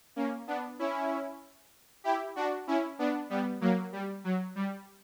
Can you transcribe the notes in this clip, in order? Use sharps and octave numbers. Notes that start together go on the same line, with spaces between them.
A#3 C#4
B3 D4
C#4 E4
E4 G4
D4 F#4
C#4 E4
B3 D4
G3 B3
F#3 A#3
G3
F#3
G3